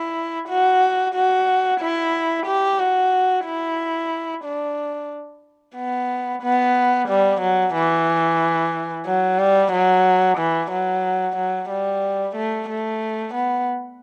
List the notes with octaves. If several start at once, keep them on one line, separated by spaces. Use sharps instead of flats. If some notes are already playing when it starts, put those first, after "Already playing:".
Already playing: E4
F#4
F#4
E4
G4
F#4
E4
D4
B3
B3
G3
F#3
E3
F#3
G3
F#3
E3
F#3
F#3
G3
A3
A3
B3